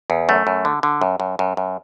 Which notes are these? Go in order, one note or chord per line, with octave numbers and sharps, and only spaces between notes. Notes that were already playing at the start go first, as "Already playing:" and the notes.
E2
F#2 A3
F#2
D3
D3
F#2
F#2
F#2
F#2